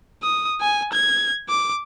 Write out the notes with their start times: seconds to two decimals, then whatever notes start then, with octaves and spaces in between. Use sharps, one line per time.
0.23 D#6
0.61 G#5
0.93 G#6
1.49 D6